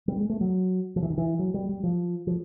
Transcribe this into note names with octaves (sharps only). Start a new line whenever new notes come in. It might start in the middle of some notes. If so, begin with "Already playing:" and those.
G3
G#3
A3
F#3
F3
E3
D#3
E3
F#3
G3
G3
F3
F3